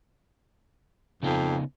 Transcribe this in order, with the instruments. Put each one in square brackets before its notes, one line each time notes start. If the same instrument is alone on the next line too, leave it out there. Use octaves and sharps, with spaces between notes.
[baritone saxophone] F2 [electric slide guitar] C#3 B3 D#4